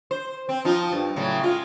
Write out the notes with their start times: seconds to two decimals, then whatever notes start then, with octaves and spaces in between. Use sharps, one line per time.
0.11 C5
0.49 C4
0.65 F3 D#4 F4
0.92 G2
1.16 A2 C#3 F#3
1.42 G#3 F4